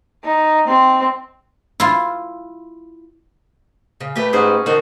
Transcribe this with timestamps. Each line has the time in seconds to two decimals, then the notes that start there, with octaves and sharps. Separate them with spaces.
0.25 D#4
0.68 C4
1.80 E4 F4
4.00 C#3
4.16 A3 G4 B4
4.33 G#2 C#4 F#4 G#4
4.66 D3 D#3 C4 F#4